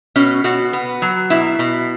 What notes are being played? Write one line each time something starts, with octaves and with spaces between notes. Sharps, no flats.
B2 C#4
B2 F#4
B3
F#3
B2 E4
B2